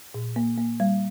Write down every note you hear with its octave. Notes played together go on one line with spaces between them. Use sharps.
A#2
A#3
A#3
G3